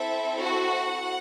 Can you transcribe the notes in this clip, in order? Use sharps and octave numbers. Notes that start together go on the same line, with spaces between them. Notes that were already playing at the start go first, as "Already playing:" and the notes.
Already playing: C4 E4 A4 E5
F#4 F#5